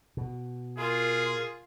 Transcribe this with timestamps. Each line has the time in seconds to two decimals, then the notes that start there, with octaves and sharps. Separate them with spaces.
0.17 B2
0.78 F4 G#4 A#4